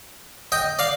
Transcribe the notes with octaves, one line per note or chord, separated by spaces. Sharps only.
D#5 G5
D5 F5